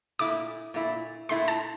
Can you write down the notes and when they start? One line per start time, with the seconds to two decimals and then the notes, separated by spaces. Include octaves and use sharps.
0.19 A#2 A3 E4 D6
0.74 A#2 A3 E4
1.29 A#2 A3 E4 C6
1.48 A5